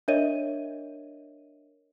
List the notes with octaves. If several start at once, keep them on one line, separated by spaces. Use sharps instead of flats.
D4 A#4 C#5 D#5 E5 D#7